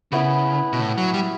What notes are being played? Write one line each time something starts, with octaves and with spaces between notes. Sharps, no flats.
C#3 B3 E4 B4
B2
A2
F#3
G3